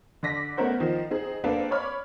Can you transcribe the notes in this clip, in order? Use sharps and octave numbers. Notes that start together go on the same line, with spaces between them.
D3 D5 A#6 B6
A3 B3 C#4 A#4 C5 F#5
D#3 F3
C4 D#4 G#4
A#3 C4 D4 A4 B4 F5
C#5 D5 B5 F6